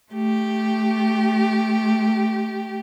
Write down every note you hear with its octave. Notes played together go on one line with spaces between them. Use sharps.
A3 G4